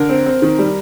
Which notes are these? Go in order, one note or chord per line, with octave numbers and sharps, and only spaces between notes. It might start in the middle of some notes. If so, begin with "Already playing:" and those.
Already playing: D3 A#4
C4
C4
D#3
G3